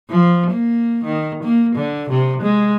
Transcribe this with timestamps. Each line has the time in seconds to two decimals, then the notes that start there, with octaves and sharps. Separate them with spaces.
0.10 F3
0.51 A#3
1.04 D#3
1.44 A#3
1.76 D3
2.10 C3
2.42 G#3